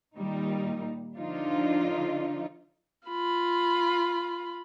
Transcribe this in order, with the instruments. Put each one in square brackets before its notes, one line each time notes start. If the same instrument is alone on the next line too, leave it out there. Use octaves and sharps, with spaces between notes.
[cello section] A#2 D#3 G3 D#4
D3 F3 D4 D#4 F4
[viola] F4 B5